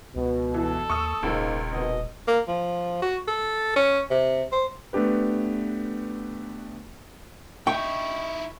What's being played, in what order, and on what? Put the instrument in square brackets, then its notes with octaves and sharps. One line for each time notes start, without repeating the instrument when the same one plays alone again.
[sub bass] C#2 [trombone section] B2
[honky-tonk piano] E3 [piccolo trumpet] A4
[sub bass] D#2 [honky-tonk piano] C#6 D#6 E6
[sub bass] D#1 [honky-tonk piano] C#2 [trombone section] G#2 A#3 D#4
[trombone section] G#1 B2 [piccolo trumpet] D#5
[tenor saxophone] A#3
F3
F#4
A4
C#4
C3
C5
[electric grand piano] A3 B3 D4 G4 B4
[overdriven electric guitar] D#4 E4 [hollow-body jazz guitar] G5 [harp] C#6